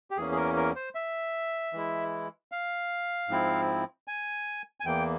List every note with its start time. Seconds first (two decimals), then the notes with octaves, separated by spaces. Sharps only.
0.11 G4
0.17 E2 E3 A#3 C#4 G#4
0.32 G#4
0.37 A#4
0.57 A#4
0.76 C5
0.95 E5
1.73 E3 G#3 E4
2.52 F5
3.29 G#2 F3 C4 E4
4.08 G#5
4.80 G#5
4.85 E2 E3 A#3 G5